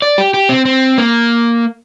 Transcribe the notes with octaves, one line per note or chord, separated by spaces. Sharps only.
D5
G4
G4
C4
C4
A#3